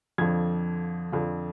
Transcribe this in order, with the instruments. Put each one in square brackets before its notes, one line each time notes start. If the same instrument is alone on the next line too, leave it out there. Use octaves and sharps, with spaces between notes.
[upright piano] F2 D3 F3 G#6
F2 D3 F3